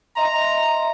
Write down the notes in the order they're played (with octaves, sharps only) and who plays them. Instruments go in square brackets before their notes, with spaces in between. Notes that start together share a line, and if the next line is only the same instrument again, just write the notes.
[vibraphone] D#5 E5 C6 [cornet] A#5